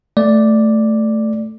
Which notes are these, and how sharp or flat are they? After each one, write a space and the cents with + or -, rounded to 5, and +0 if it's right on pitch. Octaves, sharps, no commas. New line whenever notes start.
A3 +0 D5 +0